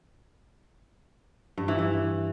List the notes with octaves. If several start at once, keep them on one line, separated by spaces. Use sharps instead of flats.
G2
E3
E3